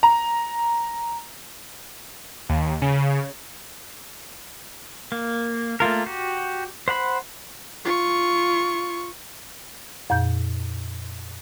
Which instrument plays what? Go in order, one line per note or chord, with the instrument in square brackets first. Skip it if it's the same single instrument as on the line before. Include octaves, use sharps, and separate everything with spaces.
[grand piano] A#5
[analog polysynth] D#2
C#3
[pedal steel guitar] A#3
A3 A#3 F4 A#4
F#4 G4
C5 F#5 B5
[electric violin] F4 C#6
[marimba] F2 A#2 G6